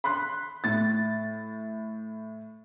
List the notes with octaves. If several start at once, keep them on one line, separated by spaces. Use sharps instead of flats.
B5 C6 F#6
A2 A6